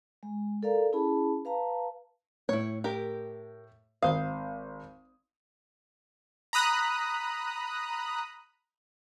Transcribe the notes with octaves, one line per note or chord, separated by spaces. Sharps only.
G#3
A4 A#4 D5 F5 A#5
C#4 E4 G#4 A5 B5
B4 F5 A5 A#5
A2 E4 C#5
G4 A#4
G#1 C5 F5 D#6
A#5 B5 D#6 F#6